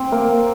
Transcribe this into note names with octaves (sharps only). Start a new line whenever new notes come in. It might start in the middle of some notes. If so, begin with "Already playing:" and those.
Already playing: C4
A#3